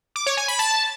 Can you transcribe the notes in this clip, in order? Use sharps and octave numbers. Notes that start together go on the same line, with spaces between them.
D6
C#5
G#5
B5
A5